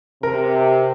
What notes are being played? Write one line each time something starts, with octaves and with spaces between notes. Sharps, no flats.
C3 A#4